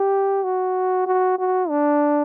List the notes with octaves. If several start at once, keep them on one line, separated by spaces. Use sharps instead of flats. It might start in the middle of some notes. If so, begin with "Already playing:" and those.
Already playing: G4
F#4
F#4
F#4
D4